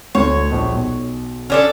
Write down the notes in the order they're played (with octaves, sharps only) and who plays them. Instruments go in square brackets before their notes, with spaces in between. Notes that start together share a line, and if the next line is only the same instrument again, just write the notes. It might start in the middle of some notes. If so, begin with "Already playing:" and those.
[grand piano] D2 [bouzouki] C#5
[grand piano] A#1
B1
[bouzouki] C#4 D4 A4